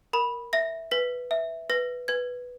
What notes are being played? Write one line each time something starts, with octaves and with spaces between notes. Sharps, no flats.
A#4 B5
E5 A#6
B4 B6
E5
B4 A#6
B4 G#6